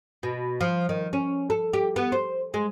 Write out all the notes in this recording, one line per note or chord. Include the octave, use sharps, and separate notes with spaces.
B2
F3
D#3
C#4
A4
G4
B3
C5
G#3